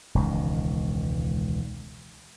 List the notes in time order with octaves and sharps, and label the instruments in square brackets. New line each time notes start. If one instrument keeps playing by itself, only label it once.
[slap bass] E1 C#2 D#3